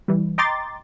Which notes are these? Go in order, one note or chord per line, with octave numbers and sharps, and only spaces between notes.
E3 G3
D#5 G5 A#5 C6 D6 A6